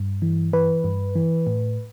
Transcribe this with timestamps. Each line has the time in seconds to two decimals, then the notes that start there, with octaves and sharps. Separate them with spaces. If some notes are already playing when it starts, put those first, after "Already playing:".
Already playing: G2
0.22 E3
0.53 E3 B4
0.84 G2
1.15 E3
1.47 A2